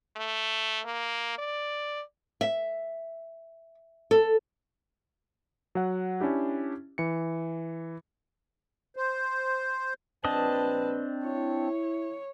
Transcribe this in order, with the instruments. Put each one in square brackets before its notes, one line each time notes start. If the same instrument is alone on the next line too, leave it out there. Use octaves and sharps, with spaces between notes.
[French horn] A3
A#3
D5
[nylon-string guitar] E5
A4
[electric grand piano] F#3 F#5
C#4 D4 E4 G4
E3 C#7
[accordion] C5
[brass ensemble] A#1 B4 [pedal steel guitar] C4 D4 D#5 [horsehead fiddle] A5
[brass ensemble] E4 [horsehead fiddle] C#5